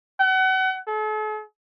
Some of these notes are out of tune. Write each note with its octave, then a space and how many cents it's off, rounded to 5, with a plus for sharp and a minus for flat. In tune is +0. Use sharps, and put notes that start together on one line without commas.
F#5 +30
A4 -45